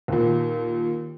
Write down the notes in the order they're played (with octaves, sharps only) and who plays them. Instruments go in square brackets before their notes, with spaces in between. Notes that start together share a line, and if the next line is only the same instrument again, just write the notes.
[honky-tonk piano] D#2 A#2